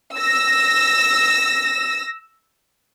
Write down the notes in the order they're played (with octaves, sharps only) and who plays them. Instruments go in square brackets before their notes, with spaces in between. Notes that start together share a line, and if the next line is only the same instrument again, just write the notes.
[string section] E6 A#6